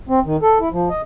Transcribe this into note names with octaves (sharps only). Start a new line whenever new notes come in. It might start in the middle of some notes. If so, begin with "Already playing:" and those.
C4
D#3
A4
E4
F3
D#5